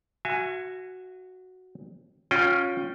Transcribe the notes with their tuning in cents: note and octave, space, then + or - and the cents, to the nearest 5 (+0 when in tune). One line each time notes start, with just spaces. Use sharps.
F#4 +0 E5 +40 G#5 +0
C#4 +0 F4 +30 G5 -10